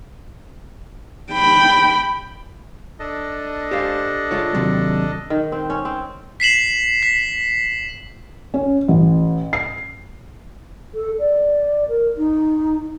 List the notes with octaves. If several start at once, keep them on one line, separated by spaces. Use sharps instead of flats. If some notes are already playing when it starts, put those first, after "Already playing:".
G5 B5
D4 A4 D#5
G4 C5 F5
G#3 F4 C#5
D#2 C3 F#3
D#3
C4
C#4
C4
B6 C7 E7 F#7
B6
C#4
A1
C7
A4
D5
A#4
D#4